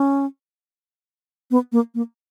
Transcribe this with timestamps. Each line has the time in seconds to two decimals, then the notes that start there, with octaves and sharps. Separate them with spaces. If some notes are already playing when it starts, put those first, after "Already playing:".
Already playing: C#4
1.51 B3
1.72 A#3
1.95 A#3